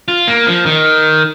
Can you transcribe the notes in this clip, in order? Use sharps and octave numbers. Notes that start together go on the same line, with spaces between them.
F4
A#3
F3
D#3